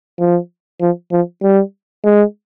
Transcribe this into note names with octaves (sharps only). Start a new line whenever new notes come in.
F3
F3
F3
G3
G#3